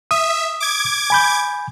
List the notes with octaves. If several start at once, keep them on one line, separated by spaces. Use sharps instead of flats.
E5 D#6
D6 G#6
G#5 B5 G6